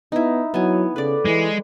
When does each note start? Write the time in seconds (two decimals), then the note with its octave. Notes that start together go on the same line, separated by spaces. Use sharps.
0.12 B3 D#4 E4
0.54 F#3 B3 E4 G#5
0.96 C#3 A4 B4 D5
1.25 E3 G#3